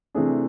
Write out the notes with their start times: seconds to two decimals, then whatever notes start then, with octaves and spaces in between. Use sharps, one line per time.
0.15 C3 E3 A3 D4 G#4